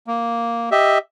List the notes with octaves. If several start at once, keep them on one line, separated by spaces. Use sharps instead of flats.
A#3
G4 D#5 E5